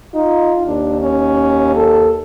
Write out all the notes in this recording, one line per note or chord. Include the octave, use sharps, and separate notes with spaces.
D#4 F4
D#2 D4
C#4
A4